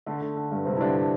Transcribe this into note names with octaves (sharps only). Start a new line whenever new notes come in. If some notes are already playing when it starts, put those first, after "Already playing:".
D3 A3
D3
D3
G2
G2 C3 C4
E4
G2 D3 D4
D3